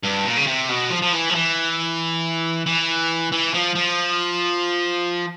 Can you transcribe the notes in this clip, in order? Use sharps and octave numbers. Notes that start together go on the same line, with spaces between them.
G2
A#2
C#3
C3
B2
F3
F3
E3
F3
E3
E3
E3
F3
F3